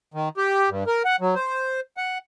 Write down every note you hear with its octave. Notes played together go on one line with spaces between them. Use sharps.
D#3
G4
G2
A#4
F#5
F#3
C5
F#5